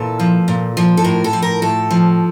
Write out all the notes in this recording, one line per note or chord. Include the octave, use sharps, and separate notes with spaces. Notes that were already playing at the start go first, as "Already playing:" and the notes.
Already playing: A#2 E3 A4
F3
A#2
F3
A4
A2 A#4
A4
F3
A#4
A2 A4
F3